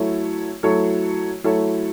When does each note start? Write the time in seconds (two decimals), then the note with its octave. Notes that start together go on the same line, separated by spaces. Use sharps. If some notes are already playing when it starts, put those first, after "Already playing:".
Already playing: F#3 A3 E4 A4 C#5
0.63 F#3 A3 E4 A4 C#5
1.44 F#3 A3 E4 A4 C#5